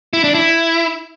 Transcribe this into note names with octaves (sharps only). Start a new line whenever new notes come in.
E4
D4
E4